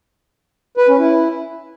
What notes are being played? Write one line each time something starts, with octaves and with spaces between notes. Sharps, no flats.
B4
C#4
E4